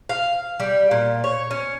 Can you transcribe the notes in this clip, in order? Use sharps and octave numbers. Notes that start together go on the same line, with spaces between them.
F5
G3
A#2
C#5
C#4